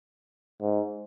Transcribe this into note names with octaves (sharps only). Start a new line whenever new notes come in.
G#2